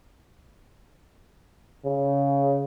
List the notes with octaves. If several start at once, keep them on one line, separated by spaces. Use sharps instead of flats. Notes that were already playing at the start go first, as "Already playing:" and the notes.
C#3